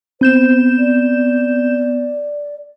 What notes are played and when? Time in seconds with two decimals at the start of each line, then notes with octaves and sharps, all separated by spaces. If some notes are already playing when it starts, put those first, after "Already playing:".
0.21 B3 C4 C5 G6 E7
0.78 D5